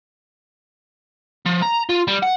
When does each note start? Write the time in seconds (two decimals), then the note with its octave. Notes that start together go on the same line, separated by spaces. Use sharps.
1.46 F3
1.62 A#5
1.89 F4
2.07 G3
2.23 F#5